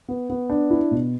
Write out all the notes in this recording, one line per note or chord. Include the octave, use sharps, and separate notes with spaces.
B3
B3
D4
E4
B2